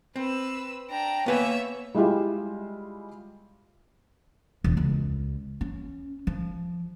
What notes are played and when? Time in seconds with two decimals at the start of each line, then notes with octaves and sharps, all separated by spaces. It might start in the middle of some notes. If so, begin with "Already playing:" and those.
0.16 C4 B4 E6
0.90 D4 G5 A#5
1.26 A#3 B3 B4 C#5 E5 G#5
1.94 G3 G#3 E4 F4 G4
4.64 E1
4.77 C#2
5.61 C#4
6.27 F3